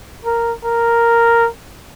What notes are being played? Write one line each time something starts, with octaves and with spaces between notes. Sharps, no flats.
A#4
A#4